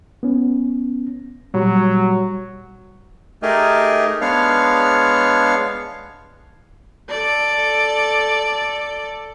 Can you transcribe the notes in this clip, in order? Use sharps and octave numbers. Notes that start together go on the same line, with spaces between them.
B3 C#4
A#2 F#3 G3
A3 D#4 G4 G#4 A#4 D#5
G#3 B3 D4 C#5 F5
A4 D5